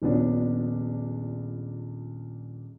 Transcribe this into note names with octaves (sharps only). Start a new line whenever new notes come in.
D#1 A#1 B3 D4 C#5